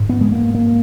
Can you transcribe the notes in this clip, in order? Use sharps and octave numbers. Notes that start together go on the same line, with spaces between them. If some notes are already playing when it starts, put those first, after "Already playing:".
Already playing: G#2
B3
G#3
A#3
A#3